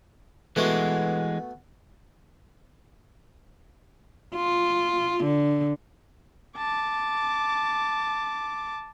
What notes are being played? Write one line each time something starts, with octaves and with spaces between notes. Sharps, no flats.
E3 G#3 A3 B3 F#4
F4
D3
A5 D6